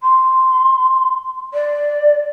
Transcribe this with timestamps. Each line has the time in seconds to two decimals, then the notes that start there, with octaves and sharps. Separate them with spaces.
0.01 C6
1.53 D5